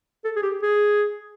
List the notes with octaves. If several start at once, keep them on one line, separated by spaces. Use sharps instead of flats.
A4
G#4
G4
G#4